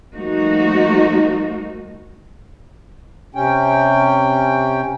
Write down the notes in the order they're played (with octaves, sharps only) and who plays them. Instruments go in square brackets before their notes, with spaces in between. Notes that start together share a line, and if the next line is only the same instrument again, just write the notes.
[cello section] F3 G3 A3 A#3 D#4 F#4
[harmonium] C3 C#4 G5